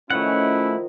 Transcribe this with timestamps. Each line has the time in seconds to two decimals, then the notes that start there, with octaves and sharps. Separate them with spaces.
0.10 D#3 F3 A3 C#4 E4 F#4 F#5